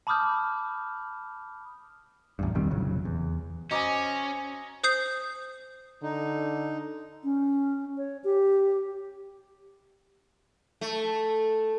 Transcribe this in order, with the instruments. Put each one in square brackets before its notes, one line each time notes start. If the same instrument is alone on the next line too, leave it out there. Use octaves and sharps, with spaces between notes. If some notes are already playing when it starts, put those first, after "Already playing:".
[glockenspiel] A5 B5 D6 D#6 F6 G6
[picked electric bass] A1 E2 G2
B1 D#3 G3 C4
F1 A#2 C#3 F#3
E2
[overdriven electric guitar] C#4 [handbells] F#4 C5 G#5 [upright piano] D#5 A#5 D6
[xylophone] C5 D#6 G6 C7
[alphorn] D3 [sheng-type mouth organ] D#4
[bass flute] C#4
C#5
G4
[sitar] A3